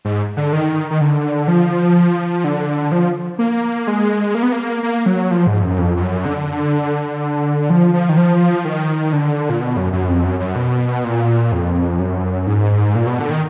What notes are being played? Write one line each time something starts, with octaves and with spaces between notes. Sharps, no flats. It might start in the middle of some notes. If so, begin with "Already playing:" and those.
G#2
D3
D#3
D#3
D3
F3
D3
F3
A#3
G#3
A#3
B3
A#3
A#3
F#3
F3
G#2
F#2
F2
F2
F#2
D3
F3
F3
D#3
F3
D#3
D3
A#2
B2
F#2
F#2
F2
F#2
F#2
B2
A#2
F2
F#2
G#2
A#2
B2
D3
D#3